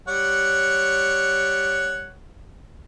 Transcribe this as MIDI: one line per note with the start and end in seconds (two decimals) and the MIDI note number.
0.08 2.14 55
0.08 2.14 73
0.08 2.14 78